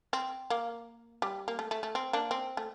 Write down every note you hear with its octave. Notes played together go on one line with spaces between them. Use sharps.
C4
A#3
G3
A#3
A3
A3
A3
C4
A#3 D4
C4
A3